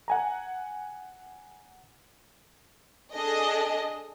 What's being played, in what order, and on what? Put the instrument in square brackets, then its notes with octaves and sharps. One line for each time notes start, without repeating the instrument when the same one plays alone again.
[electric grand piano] F#5 G#5 A#5
[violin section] D4 G#4 A4 D#5